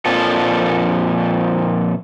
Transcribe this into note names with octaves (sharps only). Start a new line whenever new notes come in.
F2 A#2 F3 A4